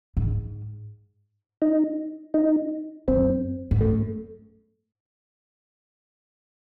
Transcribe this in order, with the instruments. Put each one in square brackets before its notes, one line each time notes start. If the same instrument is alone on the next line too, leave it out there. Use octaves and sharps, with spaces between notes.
[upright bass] G#2
[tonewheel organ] D#4
D#4
[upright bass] F#2 [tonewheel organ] C4
[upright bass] G#2
[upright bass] F#2 [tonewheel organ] A3